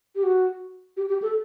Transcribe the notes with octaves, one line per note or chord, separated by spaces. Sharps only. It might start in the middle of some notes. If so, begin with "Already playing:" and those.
G4
F#4
G4
G4
A4